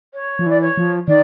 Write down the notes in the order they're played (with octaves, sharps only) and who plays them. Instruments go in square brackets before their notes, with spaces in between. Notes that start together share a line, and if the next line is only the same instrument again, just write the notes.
[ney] C#5
[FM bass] F3
[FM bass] E3 [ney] D5
[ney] C#5
[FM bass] F3
[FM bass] D#3 [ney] D5